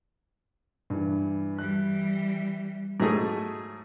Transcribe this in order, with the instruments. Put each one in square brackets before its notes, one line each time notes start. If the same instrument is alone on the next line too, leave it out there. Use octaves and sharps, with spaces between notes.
[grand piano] G2 E3
[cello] E3 G3 [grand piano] F#6
[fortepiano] G#2 F#3 A3 G#4